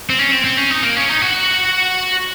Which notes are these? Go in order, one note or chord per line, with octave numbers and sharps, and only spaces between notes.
C4
C#4
C4
C4
C#4
D#4
A#3
C#4
D#4
F#4